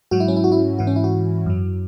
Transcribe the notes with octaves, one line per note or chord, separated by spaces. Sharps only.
G#2 F#3 F#4
E4
C#4
E4
F#4
E4
G#2 E3 F#4
C#4
E4
F#4
F#2 F#3